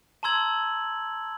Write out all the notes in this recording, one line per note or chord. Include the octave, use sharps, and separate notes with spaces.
A5 A#5 C6 E6 G#6 F#7